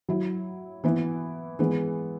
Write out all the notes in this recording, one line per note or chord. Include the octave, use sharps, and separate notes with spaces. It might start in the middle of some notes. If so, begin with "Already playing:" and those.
F#3 E4
E3 B3 E4
E3 G#3 B3